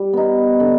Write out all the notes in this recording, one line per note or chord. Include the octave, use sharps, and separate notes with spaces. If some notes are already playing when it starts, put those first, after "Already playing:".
Already playing: G3
B3 D#4
D3